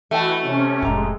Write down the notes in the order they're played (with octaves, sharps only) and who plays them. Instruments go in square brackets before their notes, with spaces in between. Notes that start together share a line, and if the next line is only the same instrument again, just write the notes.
[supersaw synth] E3 E4 F#4 [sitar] A3 [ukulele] D#5 G5 A5
[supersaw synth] C3 C#4
[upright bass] F1 A2 [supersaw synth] G#3 [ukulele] G4 A#5